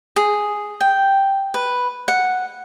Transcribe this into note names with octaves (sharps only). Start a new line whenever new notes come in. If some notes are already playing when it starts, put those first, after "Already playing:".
G#4
G5
B4
F#5